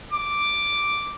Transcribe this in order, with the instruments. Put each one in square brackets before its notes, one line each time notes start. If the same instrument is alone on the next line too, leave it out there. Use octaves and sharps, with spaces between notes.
[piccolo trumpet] D6